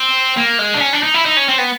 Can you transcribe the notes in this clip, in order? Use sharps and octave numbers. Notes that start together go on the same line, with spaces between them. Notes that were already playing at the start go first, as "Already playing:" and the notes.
Already playing: C4
A#3
G#3
D4
C#4
D4
D#4
E4
D#4
C#4
C4
B3